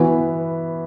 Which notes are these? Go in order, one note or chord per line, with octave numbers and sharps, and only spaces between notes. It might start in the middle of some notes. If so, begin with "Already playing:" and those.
Already playing: E3 B3 F#4